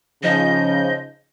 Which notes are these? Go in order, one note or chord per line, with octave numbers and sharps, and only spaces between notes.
C#3 F3 D#4 D#5 G6